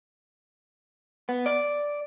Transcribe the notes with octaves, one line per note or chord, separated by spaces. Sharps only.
B3
D5